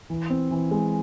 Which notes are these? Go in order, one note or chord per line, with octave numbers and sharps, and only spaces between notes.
E3
C4
E3
G#3